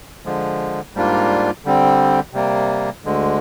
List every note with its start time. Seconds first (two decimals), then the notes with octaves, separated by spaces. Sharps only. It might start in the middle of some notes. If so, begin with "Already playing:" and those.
0.25 D3 F3 G#3
0.95 G#2 G3 A#3 D4 F4
1.65 D3 G3 C4
2.33 C3 G3 A#3
3.04 D2 D3 G#3